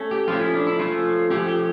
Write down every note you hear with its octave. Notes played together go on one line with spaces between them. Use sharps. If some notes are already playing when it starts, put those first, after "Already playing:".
Already playing: A3 C#4
G4
F3 A3 C#4 F4
E4
D4
E4
F3 A3 C#4 F4
F3 A3 C#4 G4
G4